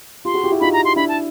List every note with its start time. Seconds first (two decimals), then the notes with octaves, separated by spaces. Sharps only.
0.25 F4 G4 C6
0.34 F#4 G#4
0.43 F4 G4
0.52 E4 F#4
0.61 D#4 F4 B5
0.73 A#5
0.85 C6
0.96 D4 E4 B5
1.09 A5